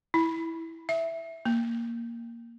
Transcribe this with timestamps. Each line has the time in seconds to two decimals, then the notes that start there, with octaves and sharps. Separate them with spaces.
0.14 E4
0.89 E5
1.45 A#3